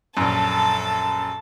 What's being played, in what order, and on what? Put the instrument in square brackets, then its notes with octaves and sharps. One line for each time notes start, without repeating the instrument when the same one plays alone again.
[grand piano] A#1 F#2 [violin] A4 A5